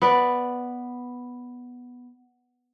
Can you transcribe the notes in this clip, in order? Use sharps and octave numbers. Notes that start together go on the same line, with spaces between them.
B3 B4 D5